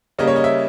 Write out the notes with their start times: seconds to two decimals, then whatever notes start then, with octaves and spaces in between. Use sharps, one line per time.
0.19 C#3 G3 A#3 D#5
0.28 C#5
0.36 D#5
0.44 E5